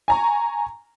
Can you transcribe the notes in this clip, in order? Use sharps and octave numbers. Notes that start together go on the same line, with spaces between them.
G#5 A#5 C#6